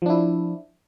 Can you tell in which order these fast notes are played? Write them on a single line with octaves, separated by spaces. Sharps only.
F3 D4 E4